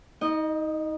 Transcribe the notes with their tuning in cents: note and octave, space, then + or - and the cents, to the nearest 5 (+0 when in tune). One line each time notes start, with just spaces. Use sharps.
D#4 +30 D#5 -15